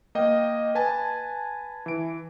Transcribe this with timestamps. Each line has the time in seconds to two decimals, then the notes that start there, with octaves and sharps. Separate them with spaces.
0.15 A#3 D#5 G5
0.75 B4 G#5 A5
1.86 E3 D7